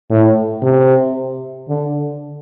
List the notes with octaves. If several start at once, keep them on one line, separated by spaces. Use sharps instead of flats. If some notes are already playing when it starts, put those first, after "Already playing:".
A2
C3
D3